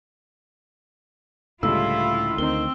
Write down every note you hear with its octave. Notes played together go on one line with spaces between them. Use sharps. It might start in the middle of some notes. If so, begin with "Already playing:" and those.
C#2 A2 D3 G3 E4 F4 E6
D2 D#3 C4 D#4 G7